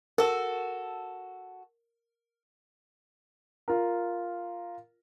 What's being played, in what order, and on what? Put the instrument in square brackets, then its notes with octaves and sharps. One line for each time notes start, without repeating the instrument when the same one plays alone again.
[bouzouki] F#4 A4 [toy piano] A#4
[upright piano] F4 A#4